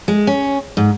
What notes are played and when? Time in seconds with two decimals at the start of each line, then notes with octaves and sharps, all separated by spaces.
0.08 G#3
0.27 C#4
0.77 G#2